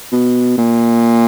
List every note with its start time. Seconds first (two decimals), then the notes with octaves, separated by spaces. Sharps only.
0.12 B2
0.58 A#2